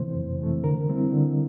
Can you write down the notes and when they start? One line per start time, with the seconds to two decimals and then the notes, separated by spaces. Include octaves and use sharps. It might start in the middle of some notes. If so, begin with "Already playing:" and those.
Already playing: C3 E3 A3 C5
0.15 F2
0.39 C3 E3 A3
0.64 D3 A#4
0.88 G3 C4 E4
1.12 D3